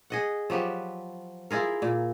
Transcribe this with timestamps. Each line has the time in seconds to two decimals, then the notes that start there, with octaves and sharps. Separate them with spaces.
0.10 G#4 D#5 F#5
0.50 F3 F#3 G4 B4
1.51 E4 F4 G#4 A#4
1.82 A#2